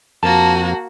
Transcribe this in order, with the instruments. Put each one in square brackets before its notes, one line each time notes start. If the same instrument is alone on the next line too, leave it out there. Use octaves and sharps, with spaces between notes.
[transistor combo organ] F2 [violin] A#3 F#4 [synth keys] A5